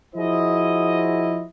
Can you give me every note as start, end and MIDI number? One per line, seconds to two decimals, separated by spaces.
0.15 1.44 53
0.15 1.44 64
0.15 1.44 66
0.15 1.44 68
0.15 1.44 72
0.15 1.44 75